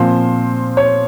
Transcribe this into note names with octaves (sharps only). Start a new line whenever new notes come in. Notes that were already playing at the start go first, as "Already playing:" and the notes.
Already playing: A#2 F3 C4 C5
C#5